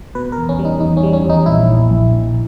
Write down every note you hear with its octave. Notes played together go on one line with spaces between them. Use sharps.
B2 B4
A#4
E2
C#4
G3
D#4
E2 D#4
C#4
G3
C#4
E2
D#4
A#1 E4
A#1
A#1
A#1